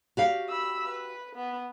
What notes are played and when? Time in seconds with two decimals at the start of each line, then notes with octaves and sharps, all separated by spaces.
0.17 F#4 G4 F5
0.49 B5 E6
0.88 B4
1.35 B3